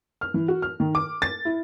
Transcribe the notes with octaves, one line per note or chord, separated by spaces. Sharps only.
F6
E3
F#4
F6
D#3
D6
A6
E4